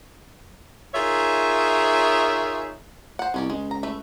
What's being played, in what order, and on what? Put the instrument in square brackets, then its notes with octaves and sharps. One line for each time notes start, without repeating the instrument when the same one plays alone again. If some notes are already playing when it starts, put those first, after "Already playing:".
[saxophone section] D#4 F4 G#4 A#4 C#5 E5
[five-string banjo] C5 F#5
[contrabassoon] C2 [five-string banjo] G#3 C#4 D5
[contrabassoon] C#2 [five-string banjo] G#3
[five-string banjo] A#5
A3 B4 E5